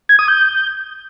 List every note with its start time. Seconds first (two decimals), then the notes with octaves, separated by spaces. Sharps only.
0.09 G#6
0.19 D#6
0.28 G6